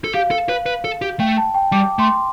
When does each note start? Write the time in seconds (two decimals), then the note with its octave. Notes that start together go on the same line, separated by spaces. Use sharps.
0.04 A4
0.14 G4 F5
0.31 A4
0.49 B4
0.66 B4
0.84 A4
1.02 G4
1.20 A3 G5
1.38 A5
1.54 G5
1.72 G3 D6
1.99 A3 C6